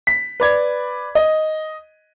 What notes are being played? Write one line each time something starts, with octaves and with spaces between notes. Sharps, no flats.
B6
B4 D5 G#6
D#5